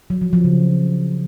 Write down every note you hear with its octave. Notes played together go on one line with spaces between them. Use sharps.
F#3
F3
F3
C#3